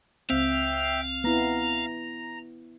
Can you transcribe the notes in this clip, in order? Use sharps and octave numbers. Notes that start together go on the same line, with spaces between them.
C#2 C4 E5 F5 G5
B3 E4 A#5